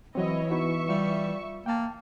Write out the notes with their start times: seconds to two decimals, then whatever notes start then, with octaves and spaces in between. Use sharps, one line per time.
0.15 E3 F#3 C4 E4 C#5 D#5
0.51 B3 D#4 F#4 E5 C#6
0.89 G3 F4
1.66 A#3 G5 A5